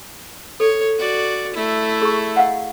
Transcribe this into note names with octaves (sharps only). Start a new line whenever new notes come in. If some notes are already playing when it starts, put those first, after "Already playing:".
A4 C#5
F#4 D5
A3 E4
G#4 C#6
F5 F#5